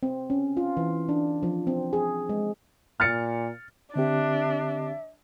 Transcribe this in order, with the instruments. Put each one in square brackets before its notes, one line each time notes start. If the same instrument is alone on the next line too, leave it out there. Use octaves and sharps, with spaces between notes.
[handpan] C4
C#4
F4
E3
D4
F3
C4
G#4
G#3
[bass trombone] A#2 [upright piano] F6 A6 C#7
[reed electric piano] D3 C4 G4 [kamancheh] D4 [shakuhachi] E5